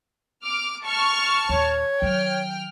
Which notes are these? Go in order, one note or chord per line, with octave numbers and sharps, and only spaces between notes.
D6 F6
A5 C#6 F6
D#2 A#2 C#5
D#3 F#3 G5 F6